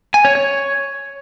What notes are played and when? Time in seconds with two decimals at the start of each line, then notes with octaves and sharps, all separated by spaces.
0.14 G#5
0.25 C#5
0.35 C#5